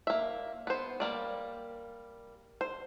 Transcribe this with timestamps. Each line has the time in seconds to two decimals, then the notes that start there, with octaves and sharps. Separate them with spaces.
0.07 A#3 E5
0.67 B3 C5
1.00 G3 A#3 D5
2.61 C5